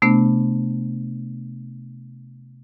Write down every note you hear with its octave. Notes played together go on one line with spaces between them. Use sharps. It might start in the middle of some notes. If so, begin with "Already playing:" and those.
C3 A3 B3 D4